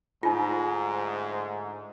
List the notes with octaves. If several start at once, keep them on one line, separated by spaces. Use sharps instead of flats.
D2 G#2 D#4 F4